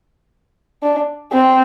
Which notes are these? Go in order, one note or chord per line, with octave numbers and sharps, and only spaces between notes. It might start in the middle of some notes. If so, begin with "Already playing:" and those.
D4
C4